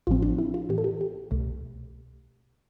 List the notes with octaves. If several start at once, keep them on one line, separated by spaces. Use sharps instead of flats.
A1 A2 F3 C4 F4
D4
E4
F4
A2 E3 B3 G4
A4
G4
G4
C2 B2 A3